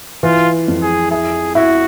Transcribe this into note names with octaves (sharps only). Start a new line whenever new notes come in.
E3 F4
F2
G#4
E4 G#4
E4 F#4